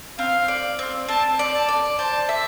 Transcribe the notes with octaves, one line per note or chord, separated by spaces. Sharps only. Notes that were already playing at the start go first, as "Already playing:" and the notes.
C4 F5
D5
C4
C4 A5
D5
A5
D5
C5 A5
E5